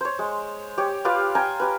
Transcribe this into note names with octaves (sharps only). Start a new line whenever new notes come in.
C5 C#5
G#3
G4 C#5
F4 G4 B4 F5
G5 G#5 A#5
G4 B4